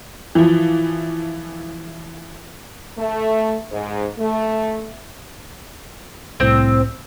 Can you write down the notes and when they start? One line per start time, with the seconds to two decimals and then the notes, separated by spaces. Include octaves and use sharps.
0.35 E3 F3
2.98 A3
3.71 G#2
4.18 A3
6.40 C2 A2 C4